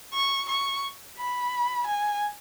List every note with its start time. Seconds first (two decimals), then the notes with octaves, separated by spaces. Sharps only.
0.14 C#6
0.49 C#6
1.18 B5
1.86 G#5